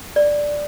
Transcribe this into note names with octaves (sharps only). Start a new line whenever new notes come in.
D5